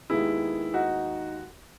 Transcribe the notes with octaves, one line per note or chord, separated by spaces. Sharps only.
D#2 D#3 G#3 B3 E4 G#4
D#4 F#4